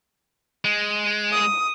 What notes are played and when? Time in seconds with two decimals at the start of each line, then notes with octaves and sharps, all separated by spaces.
0.65 G#3
1.32 D#6